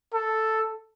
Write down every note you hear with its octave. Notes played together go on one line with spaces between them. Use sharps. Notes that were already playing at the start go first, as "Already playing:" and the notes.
A4